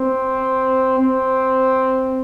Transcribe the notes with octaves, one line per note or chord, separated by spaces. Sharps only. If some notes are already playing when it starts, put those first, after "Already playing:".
Already playing: C4
C4